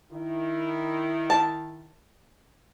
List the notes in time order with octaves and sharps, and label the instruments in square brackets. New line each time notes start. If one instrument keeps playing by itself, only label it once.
[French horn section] D#3 E4
[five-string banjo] A5